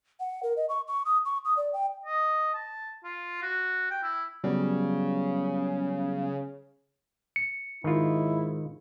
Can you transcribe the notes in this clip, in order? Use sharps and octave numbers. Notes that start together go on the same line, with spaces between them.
F#5
A#4
D#5
C#6
C#6
D#6
C#6
D#6
D5
G5
D#5
A5
F4
F#4
G5
E4
C#3 F#3 G3 B3
C#7
G#2 D#3 E4 F4